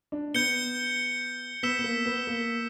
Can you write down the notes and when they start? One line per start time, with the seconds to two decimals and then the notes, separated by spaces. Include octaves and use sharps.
0.12 D4
0.34 B3 G6 C#7 G7
1.63 B3 E6 B6 E7 G7
1.79 B3
1.84 A#3
2.06 B3
2.27 A#3